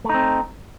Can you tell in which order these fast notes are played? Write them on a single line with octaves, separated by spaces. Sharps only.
A3 D#4 C4